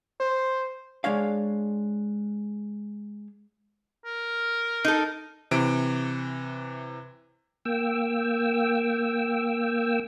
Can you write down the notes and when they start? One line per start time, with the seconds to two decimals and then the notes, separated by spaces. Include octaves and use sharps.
0.20 C5
1.04 G#3 D4 C#5 F5
4.05 A#4
4.85 D#4 A4
5.51 C3 E3 D7
7.65 A#3 G5 E6